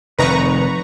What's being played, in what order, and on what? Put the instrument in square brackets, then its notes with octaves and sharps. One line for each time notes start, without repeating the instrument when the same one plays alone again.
[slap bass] F1 D#3 [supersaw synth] B4 A#5 C#6